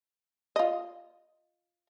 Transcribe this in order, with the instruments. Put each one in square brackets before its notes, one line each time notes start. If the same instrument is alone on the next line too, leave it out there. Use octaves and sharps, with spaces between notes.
[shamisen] F4 D#5